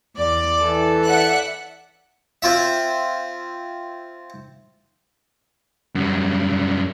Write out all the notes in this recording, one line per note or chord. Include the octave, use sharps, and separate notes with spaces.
E2 D5
E3 A4
D5 E5 F#5 F#6 C#7
C4 F4 E5
F#2 G3